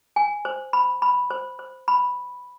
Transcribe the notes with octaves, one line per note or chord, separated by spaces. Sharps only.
G#5
C5
B5
B5
C5
C5
B5